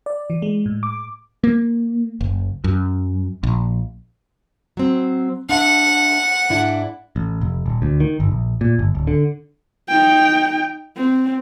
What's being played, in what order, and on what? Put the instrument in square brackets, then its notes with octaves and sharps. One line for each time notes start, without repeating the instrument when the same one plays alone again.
[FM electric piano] D5
E3
G#3
A2
D6
[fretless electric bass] A#3
F#1
F#2
A#1
[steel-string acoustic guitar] F#3 C4
[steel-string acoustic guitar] D4 E5 [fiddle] F#5
[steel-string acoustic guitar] G#2 D4 E4
[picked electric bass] A1
F1
D#1
D2
D#3
G1
A#1
A#2
G1
D1
D3
[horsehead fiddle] D#4 G5
C4